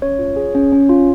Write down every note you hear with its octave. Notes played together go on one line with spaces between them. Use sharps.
C#4 C#5
F4
G#4
C#4
C#4
F4